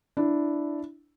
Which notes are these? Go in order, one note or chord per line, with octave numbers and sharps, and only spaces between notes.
D4 E4